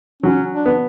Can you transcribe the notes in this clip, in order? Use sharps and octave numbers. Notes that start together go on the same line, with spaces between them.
F#3 C#4
D4
B3